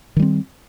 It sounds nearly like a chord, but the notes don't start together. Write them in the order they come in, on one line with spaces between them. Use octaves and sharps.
D#3 G3 C4